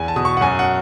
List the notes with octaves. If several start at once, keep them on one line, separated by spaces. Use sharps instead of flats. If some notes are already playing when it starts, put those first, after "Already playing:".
Already playing: E2 G#5
A5
B2 D#6
C#6
F#5
F#2 G#5
F#5